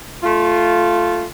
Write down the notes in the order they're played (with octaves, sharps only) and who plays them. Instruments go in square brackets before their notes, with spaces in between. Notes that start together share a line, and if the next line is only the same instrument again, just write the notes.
[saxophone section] A3 F4